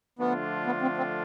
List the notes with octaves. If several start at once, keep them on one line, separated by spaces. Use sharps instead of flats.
D3 F3 A3 B3 D4 F4
B3
C4
C4